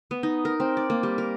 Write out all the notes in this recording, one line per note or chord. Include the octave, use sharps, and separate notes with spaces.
B3
D#4
A#4
C4
D5
A#3
G3
A#4